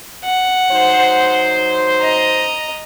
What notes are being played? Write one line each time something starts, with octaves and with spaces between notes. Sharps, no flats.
F#5
F#3 D#4 C5
D#5 A#5